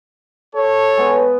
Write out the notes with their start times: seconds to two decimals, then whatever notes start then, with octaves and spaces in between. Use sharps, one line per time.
0.55 A4 C#5
0.97 G#3 B3 B4